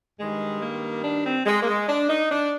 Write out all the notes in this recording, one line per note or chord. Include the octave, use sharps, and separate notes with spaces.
G2 D#3 G3 G#3
A#3
D4
C4
G#3
A#3
G#3
D4
D#4
D4